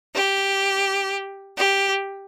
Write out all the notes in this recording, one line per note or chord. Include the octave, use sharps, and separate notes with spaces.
G4
G4